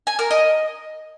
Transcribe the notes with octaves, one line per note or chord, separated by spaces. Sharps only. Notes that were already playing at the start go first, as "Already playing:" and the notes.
G#5
A#4
D#5